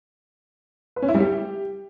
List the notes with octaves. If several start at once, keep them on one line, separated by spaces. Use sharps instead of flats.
B4
C#4
E4
G3
G4